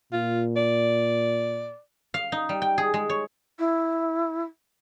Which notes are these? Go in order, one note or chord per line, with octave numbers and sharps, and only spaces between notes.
A#2 F4
D5
F5
D#4
G3
G5
G#4
G#3
C#5
E4